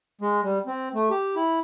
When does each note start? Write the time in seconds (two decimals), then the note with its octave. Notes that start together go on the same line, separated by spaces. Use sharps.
0.21 G#3
0.43 G3
0.66 C4
0.94 A3
1.10 G4
1.36 E4